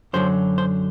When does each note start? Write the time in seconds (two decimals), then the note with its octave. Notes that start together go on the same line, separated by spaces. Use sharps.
0.13 F#2 D3 F#3 C5
0.58 C5